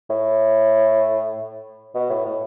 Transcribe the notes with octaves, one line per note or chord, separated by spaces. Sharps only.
A2
B2
A2
A2